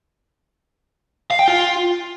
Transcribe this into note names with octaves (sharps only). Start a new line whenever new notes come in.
F5
G5
F4